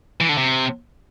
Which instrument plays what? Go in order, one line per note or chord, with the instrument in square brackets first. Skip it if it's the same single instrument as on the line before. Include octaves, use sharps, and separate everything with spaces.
[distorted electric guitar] E3
D3
C3